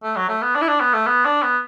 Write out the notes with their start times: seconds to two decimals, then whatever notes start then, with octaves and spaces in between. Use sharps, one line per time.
0.03 A3
0.16 F#3
0.28 A3
0.42 B3
0.55 D4
0.62 E4
0.68 D4
0.81 B3
0.94 A3
1.07 B3
1.25 D4
1.42 B3